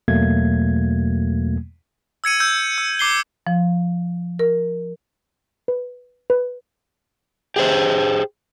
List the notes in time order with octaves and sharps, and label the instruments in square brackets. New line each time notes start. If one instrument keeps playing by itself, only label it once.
[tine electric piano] E2 B2 F#3 A3 A#3 G#6
[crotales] E6 G#6 C#7 D#7
E6 G6
E6
D6 C7 G7
[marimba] F3
A#4
[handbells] B4
B4
[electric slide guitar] G4 G#4 C5